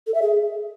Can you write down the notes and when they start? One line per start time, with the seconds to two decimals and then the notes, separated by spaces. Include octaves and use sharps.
0.07 A4
0.14 E5
0.22 G#4